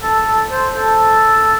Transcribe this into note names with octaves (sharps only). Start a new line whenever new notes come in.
A4
A4
C5
A4